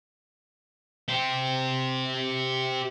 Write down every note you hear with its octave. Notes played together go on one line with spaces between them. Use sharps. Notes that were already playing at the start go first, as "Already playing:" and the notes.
G4 C5